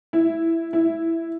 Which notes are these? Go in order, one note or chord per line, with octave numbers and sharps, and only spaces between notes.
E4
E4